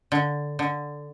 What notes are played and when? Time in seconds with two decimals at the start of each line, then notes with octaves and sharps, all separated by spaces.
0.12 D3
0.59 D3